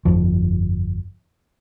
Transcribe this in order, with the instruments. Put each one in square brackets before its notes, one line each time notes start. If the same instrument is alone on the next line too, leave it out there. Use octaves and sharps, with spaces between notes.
[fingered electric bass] G1 F2 F3